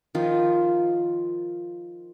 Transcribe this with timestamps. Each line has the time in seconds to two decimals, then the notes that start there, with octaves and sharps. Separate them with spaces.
0.15 D#3 F3 F4